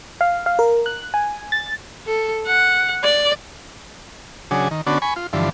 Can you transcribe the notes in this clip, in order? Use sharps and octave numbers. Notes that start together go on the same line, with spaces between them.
F5
F5
A#4
F#6
G#5
A6
A4
F#5
D5
C#3 F#3 D4 G#4
D#3
D3 B3 C#4 D4 F#4
G#5 B5 C#6
F4
G2 D3 E3 F3